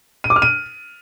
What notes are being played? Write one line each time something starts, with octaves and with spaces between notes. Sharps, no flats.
D#7
D6
F6
D#7